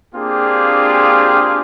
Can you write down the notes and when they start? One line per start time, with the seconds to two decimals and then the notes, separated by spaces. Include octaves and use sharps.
0.15 A#3 C4 D4 F4 G4 G#4